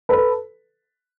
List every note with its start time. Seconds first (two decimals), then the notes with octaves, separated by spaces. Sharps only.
0.09 A4 B4